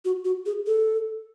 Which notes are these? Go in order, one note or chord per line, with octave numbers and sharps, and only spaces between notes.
F#4
F#4
G#4
A4